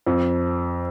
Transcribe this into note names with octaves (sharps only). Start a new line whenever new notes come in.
F2